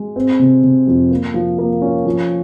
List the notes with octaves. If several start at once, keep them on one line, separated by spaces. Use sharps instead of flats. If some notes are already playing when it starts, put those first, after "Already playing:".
Already playing: G#3
C4
C3
C3
F2
A#3
F3
A#3
C#4
F3